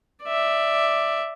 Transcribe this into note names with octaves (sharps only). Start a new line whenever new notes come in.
D5 E5